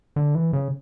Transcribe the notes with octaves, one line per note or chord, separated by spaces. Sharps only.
D3
E3
C#3